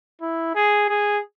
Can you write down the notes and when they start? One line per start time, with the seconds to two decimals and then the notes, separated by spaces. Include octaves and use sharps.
0.22 E4
0.55 G#4
0.89 G#4